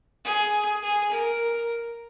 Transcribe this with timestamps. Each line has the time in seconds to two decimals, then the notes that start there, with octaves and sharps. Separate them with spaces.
0.25 G#4
0.82 G#4
1.11 A#4